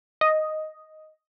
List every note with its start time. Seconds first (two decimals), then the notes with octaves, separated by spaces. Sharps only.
0.21 D#5